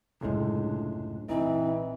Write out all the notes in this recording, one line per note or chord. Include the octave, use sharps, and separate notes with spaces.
C#2 F#2 A2 C3 G#3 D4
A#1 E3 C4 D#4